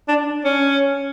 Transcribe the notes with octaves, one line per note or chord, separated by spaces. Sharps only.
D4
C#4